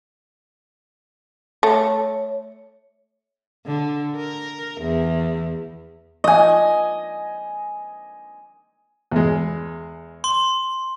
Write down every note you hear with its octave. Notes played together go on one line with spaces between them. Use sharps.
A3 C#5
D3
A#4
E2
D#5 G#5
E2 G#3
C6